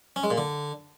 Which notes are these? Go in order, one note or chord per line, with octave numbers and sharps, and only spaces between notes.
C#4
G#3
A#2
D3